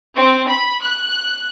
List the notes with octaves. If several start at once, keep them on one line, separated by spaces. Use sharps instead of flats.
C4
B5
F#6